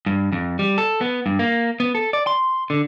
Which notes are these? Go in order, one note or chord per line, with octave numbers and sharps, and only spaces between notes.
G2
F2
G3
A4
B3
G2
A#3
B3
A4
D5
C6
D3